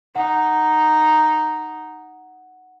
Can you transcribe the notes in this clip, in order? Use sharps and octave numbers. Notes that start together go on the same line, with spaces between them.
D#4 F#5